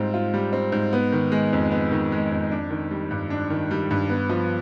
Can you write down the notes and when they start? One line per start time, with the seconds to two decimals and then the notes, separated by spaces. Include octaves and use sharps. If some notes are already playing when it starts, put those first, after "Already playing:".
Already playing: G#2 G3 C4 F4
0.14 F4
0.34 G3
0.53 C4
0.72 G#2
0.93 B3
1.12 D#3
1.32 G#3
1.53 F2
1.71 B3
1.92 D#3
2.12 G#3
2.32 F2
2.51 D4
2.70 D#3
2.91 G3
3.11 G2
3.30 D4
3.50 D#3
3.71 G3
3.91 G2
4.09 B3
4.29 F3